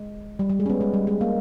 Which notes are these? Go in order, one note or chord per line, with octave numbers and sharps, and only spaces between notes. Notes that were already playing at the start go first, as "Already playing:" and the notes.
Already playing: G#3
G3
G3
G#3
C#4
B3
G#3
G3
G#3
A#3